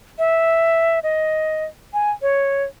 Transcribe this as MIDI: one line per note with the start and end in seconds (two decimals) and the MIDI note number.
0.19 0.99 76
1.03 1.65 75
1.94 2.11 80
2.22 2.64 73